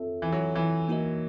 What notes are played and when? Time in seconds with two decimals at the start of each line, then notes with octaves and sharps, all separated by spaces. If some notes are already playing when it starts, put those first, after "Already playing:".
Already playing: C4 F4 A4 C#5 E5
0.22 E3
0.32 F#3
0.55 E3
0.88 A#3 D#4 F#4 A#4 D#5